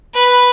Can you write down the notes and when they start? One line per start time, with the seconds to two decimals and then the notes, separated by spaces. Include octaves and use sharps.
0.14 B4